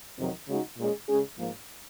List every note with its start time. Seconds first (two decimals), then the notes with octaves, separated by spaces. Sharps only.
0.17 F2 C3 D#3 F#3
0.47 C#3 G#3 D#4 F#4
0.77 A#2 G#3 C#4 G#4
1.08 C#3 G#3 C#4 G#4
1.38 G#2 F3 A#3